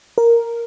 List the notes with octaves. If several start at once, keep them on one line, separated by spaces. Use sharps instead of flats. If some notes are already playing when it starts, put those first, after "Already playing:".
A#4